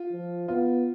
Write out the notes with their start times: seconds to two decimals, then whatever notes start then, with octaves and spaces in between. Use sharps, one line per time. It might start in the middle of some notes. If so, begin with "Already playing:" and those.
Already playing: F4
0.11 F3
0.48 B3 F4